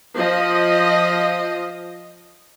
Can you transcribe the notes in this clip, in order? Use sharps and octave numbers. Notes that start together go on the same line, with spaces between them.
F3 D#5